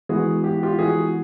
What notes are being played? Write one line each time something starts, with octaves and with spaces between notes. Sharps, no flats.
E3 G#3 B3 E4 F#4 G#4
G4
F#4
F4 G4
E3 G#3 B3 E4 F#4 G#4